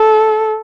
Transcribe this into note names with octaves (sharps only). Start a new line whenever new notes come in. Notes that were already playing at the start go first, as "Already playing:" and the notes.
Already playing: A4